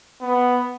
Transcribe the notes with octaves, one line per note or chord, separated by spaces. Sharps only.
B3